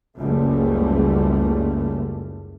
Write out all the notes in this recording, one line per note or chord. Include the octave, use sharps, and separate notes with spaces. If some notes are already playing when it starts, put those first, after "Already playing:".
F#1 C#2 G3 A3